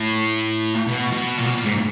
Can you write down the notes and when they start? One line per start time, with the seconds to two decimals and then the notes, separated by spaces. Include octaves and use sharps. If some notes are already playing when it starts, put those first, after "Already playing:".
Already playing: A2
0.87 B2
1.13 B2
1.39 A#2
1.46 B2
1.54 A#2
1.64 G#2